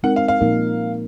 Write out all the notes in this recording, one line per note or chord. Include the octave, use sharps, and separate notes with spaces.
G#3 C4 D#4 A#4 F#5
F5
F5
A#2 F3 A#3 D#4 A#4